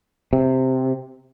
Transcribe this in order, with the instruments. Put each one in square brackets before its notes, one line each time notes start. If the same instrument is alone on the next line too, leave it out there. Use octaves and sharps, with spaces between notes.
[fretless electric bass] C3